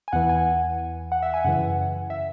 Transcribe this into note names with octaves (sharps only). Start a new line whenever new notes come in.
G#5
E2 E3 F#5
G#5
F#5
E5
G#5
F#2 C#3 E3 F#5
E5